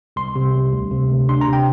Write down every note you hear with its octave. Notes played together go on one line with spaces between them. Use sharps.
C2 C6
C3
C2
D2
C3
D2
D4 C6
A#5
C3
G5